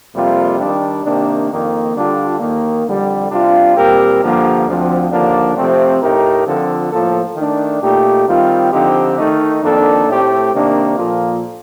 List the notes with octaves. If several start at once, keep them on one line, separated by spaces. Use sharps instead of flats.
F2 C3 G3 A#3 F4
D#3 G3 D4
C3 D#3 A#3 D4
F2 D#3 A#3
D3 G3 D4 F4 A4
D#2 D#3 A#3
F2 D3 G3
C3 G3 D4 F4
A#2 G3 C4 G4 A#4
G2 D3 F3 A#3
D2 D3 F3 C4
D#2 D3 F3 A#3 D4
C3 F3 A3 C4
A2 A3 D#4 G4 A#4
D3 F3 C4 F4 A4
A2 F3 A#3 F4 A4
D#3 A3 D4
A#2 A3 D#4 G4
D#3 G3 C4 F4
D3 F3 C4 D#4 G4
D#3 A3 D#4
F2 D#3 A#3 D4 A4
A2 A3 C4 G4
C3 D#3 A#3 D4
A#2 F3 A#3 F4 A4